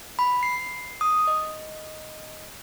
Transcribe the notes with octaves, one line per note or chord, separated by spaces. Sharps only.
B5
C7
D#6
D#5